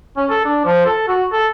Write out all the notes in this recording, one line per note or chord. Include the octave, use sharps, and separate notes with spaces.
C#4
A4
D4
F3
A4
F#4
A4